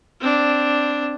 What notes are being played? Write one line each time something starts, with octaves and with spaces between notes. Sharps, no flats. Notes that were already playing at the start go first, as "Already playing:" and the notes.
C4 D4